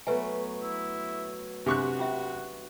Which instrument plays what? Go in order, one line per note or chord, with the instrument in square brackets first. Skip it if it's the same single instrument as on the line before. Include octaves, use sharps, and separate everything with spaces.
[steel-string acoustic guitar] F#3 A3 B3 [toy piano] B4 E5 G#5
[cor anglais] E4
[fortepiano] C3 C#6 F#6 [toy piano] D4 G#4 C6 [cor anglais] F#4
[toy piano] C#4 F4 E5